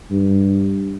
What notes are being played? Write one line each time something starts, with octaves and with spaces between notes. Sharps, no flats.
G2